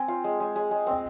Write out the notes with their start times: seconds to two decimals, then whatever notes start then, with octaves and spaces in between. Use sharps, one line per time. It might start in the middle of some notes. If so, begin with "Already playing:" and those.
Already playing: C4 G#5
0.08 F4
0.24 G#3
0.40 G#3
0.56 G#3
0.71 G#3
0.87 C4 D#5